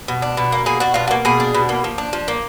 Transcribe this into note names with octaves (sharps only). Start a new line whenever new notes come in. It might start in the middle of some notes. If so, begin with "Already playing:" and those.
B2
D4
B2
A#3
B2 G#4
D4 F#4
B2 F4
F#4
A#3
B2 G#4
D4
B2
A#3
F3
D4
F3
A#3